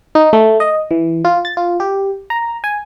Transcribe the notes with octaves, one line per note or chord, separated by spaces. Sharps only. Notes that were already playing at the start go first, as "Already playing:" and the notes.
D#4
A3
D#5
E3
F4
A6
F4
G4
A#5
G#5